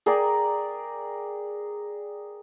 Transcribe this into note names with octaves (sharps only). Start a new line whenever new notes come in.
G#4 A#4 D5 G5